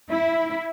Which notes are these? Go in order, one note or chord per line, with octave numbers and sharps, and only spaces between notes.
E4